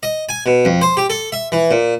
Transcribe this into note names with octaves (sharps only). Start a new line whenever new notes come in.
D#5
G#5
B2
F2
C5
G4
A4
E5
E3
A#2